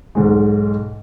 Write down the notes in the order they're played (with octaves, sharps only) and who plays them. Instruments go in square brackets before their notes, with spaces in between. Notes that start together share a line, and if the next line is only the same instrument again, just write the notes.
[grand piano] B1 G#2 G#3